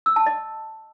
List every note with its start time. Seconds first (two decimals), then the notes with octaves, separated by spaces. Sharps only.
0.06 E6
0.16 A5
0.26 D#5